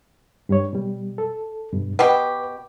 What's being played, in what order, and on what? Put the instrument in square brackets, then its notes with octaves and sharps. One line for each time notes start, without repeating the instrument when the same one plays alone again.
[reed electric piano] G2 G3 C#5
B2 G3
A4
G2 B2
[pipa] B2 G4 [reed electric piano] B4